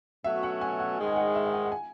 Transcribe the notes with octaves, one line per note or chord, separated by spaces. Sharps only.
B2 F#3 A3 C#4 F#4 E5
F#5
G#5
F#5
G#2 D#3 G#3
G#5
F#5
E5
E5
F#5
F#5
G#5